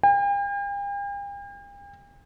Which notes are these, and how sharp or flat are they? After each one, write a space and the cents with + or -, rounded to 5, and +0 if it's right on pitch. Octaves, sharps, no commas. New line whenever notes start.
G5 +45